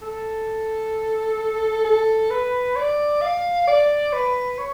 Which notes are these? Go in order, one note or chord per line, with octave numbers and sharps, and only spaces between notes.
A4
A4
B4
D5
F5
D5
B4
C#5